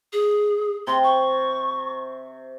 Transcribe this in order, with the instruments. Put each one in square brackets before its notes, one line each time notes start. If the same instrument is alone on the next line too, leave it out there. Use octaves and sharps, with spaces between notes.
[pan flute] G#4
[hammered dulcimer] C3 [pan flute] C6
[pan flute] C#6